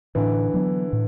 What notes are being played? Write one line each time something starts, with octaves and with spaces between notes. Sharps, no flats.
A2 D3 E3
F#3 B3 D4
A2